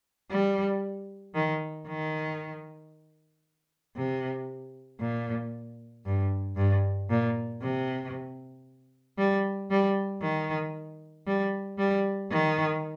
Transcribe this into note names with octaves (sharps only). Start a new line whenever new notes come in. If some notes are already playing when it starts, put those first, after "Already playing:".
G3
D#3
D#3
C3
A#2
G2
G2
A#2
C3
G3
G3
D#3
G3
G3
D#3